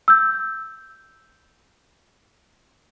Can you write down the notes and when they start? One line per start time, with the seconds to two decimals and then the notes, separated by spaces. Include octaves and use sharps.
0.08 E6 G6